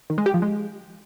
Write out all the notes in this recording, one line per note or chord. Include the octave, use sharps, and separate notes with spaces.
D#3
G#3
G4
F3
G#3